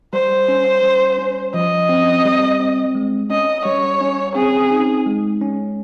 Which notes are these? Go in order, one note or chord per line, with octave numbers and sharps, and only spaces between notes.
G3 C5
C#4
G3
C#4
F3 D#5
C4
G3
C4
G#3
C#4 D#5
G3 C#5
C#4
C4 G#4
D#4
G#3
C#4